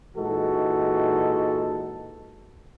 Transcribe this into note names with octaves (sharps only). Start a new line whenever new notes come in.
A#2 E3 G#3 D#4 F#4 A4